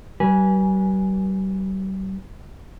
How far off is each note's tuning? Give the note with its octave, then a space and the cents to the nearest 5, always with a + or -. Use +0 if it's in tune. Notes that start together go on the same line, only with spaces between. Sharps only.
G3 -40 B4 -30 G#5 +0